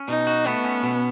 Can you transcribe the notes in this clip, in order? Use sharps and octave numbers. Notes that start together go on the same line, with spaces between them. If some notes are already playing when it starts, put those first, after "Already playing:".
Already playing: C#4
B2 D#4
F#4
A3 B3
C#4
B2